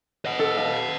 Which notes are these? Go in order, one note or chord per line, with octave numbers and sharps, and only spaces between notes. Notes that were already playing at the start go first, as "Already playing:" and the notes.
D#5 F#5
A4
F5 A5